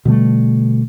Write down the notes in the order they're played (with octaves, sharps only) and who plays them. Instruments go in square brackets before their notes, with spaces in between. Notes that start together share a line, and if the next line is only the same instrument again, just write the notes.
[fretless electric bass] B2 D3 G3 A3